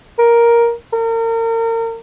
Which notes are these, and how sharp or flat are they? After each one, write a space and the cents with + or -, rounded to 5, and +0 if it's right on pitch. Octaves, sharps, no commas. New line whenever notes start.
A#4 +5
A#4 -35